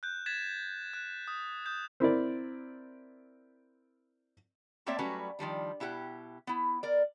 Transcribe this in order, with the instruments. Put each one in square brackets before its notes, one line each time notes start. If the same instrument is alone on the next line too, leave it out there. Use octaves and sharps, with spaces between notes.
[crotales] F#6 G6
G#6 A6 B6 E7
F#6
D#6
D#6 G6
[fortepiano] C4 E4 A#4 D5
[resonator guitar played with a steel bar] A3 A#3 C4 C#5 D5 E5
F#3 G3 A3 C#4 F#4 B4
D#3 F3 G3 D4
B2 E4 G4 A4 F#5
B3 E4
A#4 D5